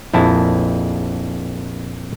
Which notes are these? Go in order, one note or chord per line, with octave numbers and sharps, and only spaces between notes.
A#1 F2 E4 A5